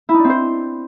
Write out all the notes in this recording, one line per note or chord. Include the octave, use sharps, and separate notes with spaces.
E4
D#4
D4
C4
C5